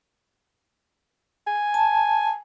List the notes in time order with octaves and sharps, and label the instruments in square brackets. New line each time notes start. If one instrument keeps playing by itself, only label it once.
[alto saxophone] G#5
[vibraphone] A5